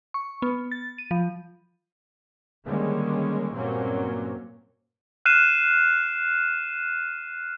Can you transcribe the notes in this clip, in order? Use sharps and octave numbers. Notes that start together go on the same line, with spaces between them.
C#6
B3
A6
D#7
F3
D3 D#3 G3 G#3 A#3 C#4
G2 A#2 F#3 A#3 C4 C#4
F6 F#6 C7 D#7 E7